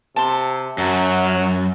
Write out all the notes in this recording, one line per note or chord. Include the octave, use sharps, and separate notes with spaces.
C3 A5 C6
F#2 F#3